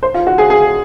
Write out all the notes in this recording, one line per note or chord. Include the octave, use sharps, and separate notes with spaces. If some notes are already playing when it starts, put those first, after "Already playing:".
C5
F4
F#4
G#4
G#4